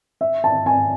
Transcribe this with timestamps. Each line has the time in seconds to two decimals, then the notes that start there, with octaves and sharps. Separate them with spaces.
0.21 E5
0.44 A5
0.66 G#5